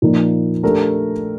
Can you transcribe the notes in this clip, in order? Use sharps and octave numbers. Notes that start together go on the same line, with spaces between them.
A#2 F3 A#3 D#4
A3 D4 G4 A#4